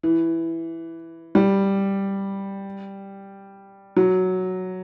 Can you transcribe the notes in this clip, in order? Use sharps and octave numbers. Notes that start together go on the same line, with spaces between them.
E3
G3
F#3